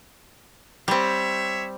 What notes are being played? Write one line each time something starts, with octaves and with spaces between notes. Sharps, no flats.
G3 C4 C#5 E5